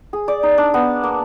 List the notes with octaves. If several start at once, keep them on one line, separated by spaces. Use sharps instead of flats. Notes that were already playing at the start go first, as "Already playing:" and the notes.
G#4
D5
D#4
D4
B3
A#3